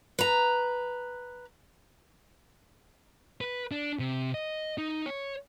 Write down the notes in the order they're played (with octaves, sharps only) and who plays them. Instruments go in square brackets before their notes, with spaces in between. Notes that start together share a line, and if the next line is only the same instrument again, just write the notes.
[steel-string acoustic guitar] B4 A#5
[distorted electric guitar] B4
D4
C3
D#5
D#4
C#5